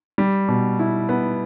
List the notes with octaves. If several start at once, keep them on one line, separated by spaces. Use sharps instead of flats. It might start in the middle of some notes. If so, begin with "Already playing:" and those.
G3
B2
E4
B3